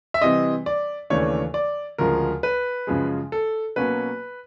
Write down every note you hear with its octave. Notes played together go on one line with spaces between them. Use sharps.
E5
C3 E3 G3 C4 D#5
D5
D#2 C#3 E3 A3 D4 C#5
D5
D2 C#3 F3 G#3 A#4
B4
F#2 C#3 F3 G#3
A4
B2 F#3 A#3 C#4 B4